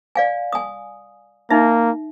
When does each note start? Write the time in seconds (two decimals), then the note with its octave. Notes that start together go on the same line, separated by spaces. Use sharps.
0.15 D5 F5 G#5
0.53 G#5 D#6
1.50 A#3 D#4 E5